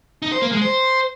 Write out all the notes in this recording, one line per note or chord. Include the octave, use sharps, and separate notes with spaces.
D#4
C5
A#3
G#3
C5